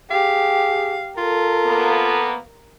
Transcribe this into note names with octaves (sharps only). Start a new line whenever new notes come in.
G4 G#4 F5
F4 A4 A#4
F2 A#3 B3